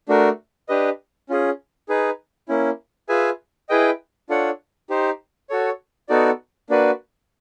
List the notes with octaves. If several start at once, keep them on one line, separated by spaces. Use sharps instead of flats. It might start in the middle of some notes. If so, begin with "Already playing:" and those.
A3 D4 F#4 A#4
D4 G4 B4 D#5
C#4 F4 G#4
D#4 G#4 B4
A#3 C#4 E4
F4 G#4 B4 E5 G#5
E4 G#4 B4 D#5 G5
D4 F4 A4 C#5 F#5
D#4 G4 C5
F#4 A4 C#5
B3 D#4 F#4 A4 D5
A#3 D4 F#4 B4 D5